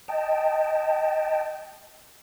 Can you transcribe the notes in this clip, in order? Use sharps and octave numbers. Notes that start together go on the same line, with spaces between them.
D#5 G5 A5